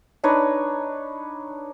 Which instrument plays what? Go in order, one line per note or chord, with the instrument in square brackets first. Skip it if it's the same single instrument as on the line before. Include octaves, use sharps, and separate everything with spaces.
[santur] D4 D#4 B4 C#5